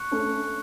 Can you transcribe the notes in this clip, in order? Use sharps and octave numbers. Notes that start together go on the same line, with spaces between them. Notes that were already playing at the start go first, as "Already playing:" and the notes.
Already playing: C#6 F#6 C#7
A3 C#4